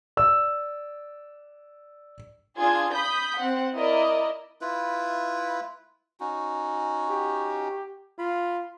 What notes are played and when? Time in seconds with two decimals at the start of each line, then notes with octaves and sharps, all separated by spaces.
0.17 D5 E6
2.58 D4 F4 G#4 G#6
2.93 B5 D#6 G6 B6
3.37 C4 F#5
3.74 E4 A#4 D5 D#5
4.61 E4 F4 B4
6.20 C#4 D#4 F#4
7.09 G4
8.19 F4 B5